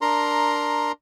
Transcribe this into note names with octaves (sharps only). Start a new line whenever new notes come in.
D4 A#4 A#5 C6